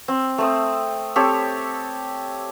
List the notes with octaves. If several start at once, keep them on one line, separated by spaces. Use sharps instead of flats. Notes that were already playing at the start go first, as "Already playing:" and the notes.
C4
A3 C4 D#6
C4 G4 A4 C#5